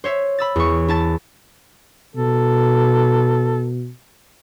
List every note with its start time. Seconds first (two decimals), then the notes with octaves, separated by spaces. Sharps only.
0.04 C5 C#5 E5
0.38 B5 E6 A6
0.56 E2 C#6
0.88 E4 A5 A6
2.16 B2 A4